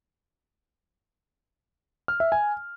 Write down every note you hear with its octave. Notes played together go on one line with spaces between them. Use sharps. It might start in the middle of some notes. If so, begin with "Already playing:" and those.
F6
E5
G#5